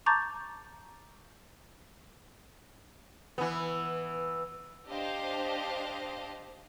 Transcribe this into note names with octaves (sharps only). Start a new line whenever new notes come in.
A5 A#5 C#6 D6 G6 A6
E3 B3
D4 G4 C5 D#5 F5